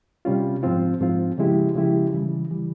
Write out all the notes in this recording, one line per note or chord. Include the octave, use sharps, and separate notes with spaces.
C3 G3 C#4 F4
G#2 F3 C4 F4
G#2 F3 C4 F4
C#3 F3 G#3 E4 G4
C#3 F3 G#3 E4 G4
C#3 E3 G3
C#3 E3 G3